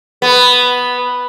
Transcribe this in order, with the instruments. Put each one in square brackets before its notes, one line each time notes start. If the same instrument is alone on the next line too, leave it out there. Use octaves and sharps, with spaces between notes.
[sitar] B3